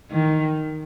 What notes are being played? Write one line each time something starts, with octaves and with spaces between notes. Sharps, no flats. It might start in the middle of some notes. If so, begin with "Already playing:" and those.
D#3